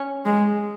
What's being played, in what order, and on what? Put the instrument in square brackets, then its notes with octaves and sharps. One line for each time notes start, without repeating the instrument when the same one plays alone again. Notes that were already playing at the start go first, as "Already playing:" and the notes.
Already playing: [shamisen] C#4
[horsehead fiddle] G#3